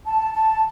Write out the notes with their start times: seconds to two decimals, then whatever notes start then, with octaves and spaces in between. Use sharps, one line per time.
0.03 A5
0.34 A5